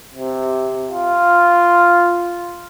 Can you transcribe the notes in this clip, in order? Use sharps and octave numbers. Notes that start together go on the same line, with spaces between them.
C3
F4